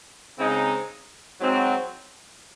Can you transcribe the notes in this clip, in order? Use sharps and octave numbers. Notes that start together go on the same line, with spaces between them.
C#3 G#3 C4 D#4
G#2 F#3 C4 F#4